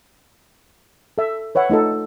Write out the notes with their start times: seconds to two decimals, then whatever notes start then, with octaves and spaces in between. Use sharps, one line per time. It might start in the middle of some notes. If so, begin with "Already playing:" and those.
1.18 A4 E5
1.55 B4 C#5 E5 F#5
1.70 A3 D#4 F4 A4